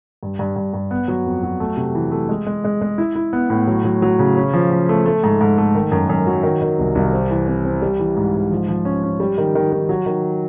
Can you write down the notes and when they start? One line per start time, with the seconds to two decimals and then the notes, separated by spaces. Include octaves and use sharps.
0.23 G2
0.39 G2
0.56 G2
0.74 G2
0.91 B3
1.08 F#3
1.26 F2
1.43 F#3
1.60 A3
1.77 C3
1.95 E3
2.11 A3
2.29 G#3
2.47 G#3
2.64 G#3
2.81 G#3
2.98 E4
3.15 E4
3.33 B3
3.50 A2
3.67 F#3
3.85 F#3
4.02 F#3
4.19 C#3
4.37 C#4
4.53 F3
4.71 F3
4.89 A3
5.06 A3
5.24 G#2
5.41 G#2
5.58 A3
5.75 D#3
5.92 F#2
6.10 F#2
6.27 F#3
6.43 D#3
6.62 D#3
6.79 C2
6.95 C2
7.13 C4
7.31 E3
7.48 C4
7.65 C4
7.82 G3
7.99 E3
8.17 G#2
8.34 G#2
8.51 F3
8.68 F3
8.85 C#4
9.03 C#4
9.20 G3
9.38 D#3
9.55 D#3
9.72 D#3
9.89 F#3
10.06 D#3